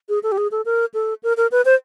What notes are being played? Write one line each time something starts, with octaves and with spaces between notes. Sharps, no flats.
G#4
A4
G4
G#4
A4
A#4
A4
A#4
A#4
B4
C5